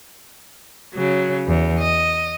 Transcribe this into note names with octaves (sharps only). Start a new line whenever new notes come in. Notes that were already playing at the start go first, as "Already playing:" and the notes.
C#3 F#3
E2
D#5